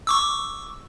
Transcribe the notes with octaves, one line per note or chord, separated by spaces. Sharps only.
C#6 D6 E6